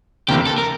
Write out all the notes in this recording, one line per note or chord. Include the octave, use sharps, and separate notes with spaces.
D2 C3 E3 A#3 G4
A4
A#4